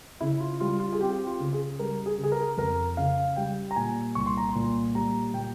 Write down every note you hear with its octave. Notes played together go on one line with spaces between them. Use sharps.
C#3 E4
F4
G3 F4
F4
G#4
C4 G4
F4
C#3
G#4
G3 A#4
G#4
C#3
G#4
A#4
F2 A#4
C#3 F5
G3 G5
A#5
A#2 G#5
C2 C#6
C6
A#5
C6
A#2
G3 A#5
A#2 G5